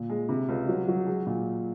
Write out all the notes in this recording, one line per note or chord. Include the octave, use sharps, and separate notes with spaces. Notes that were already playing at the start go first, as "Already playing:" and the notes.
Already playing: A#2
G#3
C3
C#2
F#3
F#3
G#3
A#2